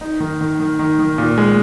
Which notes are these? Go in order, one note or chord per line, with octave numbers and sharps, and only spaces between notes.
D#4
D#3
D#3
D#3
D#3
D#3
A#2
G#3